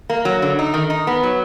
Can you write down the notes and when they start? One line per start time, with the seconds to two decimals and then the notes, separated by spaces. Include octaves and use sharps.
0.10 A#3
0.25 F#3
0.42 D3
0.59 D#4
0.74 D#3
0.90 D#4
1.07 B3
1.23 F#3